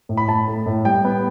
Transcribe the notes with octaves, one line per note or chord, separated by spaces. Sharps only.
A2
B5
A2 A5
A3
A2
G3 G5
B3